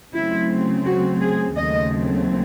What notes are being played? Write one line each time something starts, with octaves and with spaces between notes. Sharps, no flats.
C#3 F#3 A3 C4 E4
F#4
G#4
D#2 C#3 F#3 A3 C4 D#5